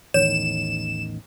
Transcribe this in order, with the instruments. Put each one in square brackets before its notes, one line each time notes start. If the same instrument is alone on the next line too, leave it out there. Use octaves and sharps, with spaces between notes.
[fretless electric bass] A1 E2 D#3 [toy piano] C#5 [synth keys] E7